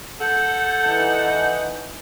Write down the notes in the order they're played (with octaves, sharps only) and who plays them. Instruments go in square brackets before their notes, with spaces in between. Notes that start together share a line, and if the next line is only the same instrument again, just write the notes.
[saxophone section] A4 [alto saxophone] F#5 [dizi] G6
[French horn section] E3 D#4